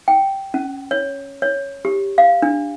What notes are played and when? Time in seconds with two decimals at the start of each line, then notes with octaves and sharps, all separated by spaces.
0.08 G5
0.54 C#4
0.91 C#5
1.42 C#5
1.85 G4
2.18 F5
2.42 D4